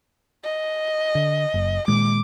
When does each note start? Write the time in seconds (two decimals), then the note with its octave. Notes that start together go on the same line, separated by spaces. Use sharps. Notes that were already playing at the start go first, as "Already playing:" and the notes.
0.44 D#5
1.15 D3
1.54 F#1
1.88 A#2 D#3 G#3 D6